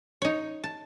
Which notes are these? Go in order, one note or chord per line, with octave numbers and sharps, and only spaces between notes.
D#4 C#5
A5